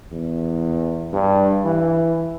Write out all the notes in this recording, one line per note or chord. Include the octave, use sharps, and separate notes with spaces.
E2
G2
E3